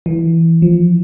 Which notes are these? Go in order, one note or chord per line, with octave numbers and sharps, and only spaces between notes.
E3
F3